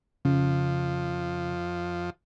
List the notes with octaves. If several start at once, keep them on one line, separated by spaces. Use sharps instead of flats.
F2 C#3 F3